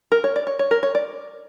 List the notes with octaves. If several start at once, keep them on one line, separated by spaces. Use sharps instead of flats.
A#4
C#5
D5
C#5
C#5
A#4
C#5
D5